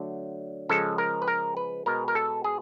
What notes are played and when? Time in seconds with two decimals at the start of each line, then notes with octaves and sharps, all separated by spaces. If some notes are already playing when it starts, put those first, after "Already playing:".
Already playing: D3 F#3 A3
0.69 C#3 F3 G#3 A4
0.98 A#4
1.22 B4
1.28 A#4
1.57 B4
1.86 B2 G#3 A#4
2.08 A#4
2.15 A4
2.44 G#4